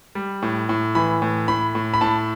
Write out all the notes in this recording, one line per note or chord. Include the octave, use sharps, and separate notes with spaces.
G3
A2
A2
E3 B5
A2
A2 B5
A2
B5
A2 A5